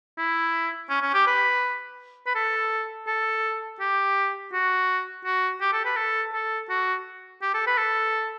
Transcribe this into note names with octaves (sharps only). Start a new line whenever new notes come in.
E4
C#4
C#4
G4
B4
B4
A4
A4
G4
F#4
F#4
G4
A4
B4
A4
A4
F#4
G4
A4
B4
A4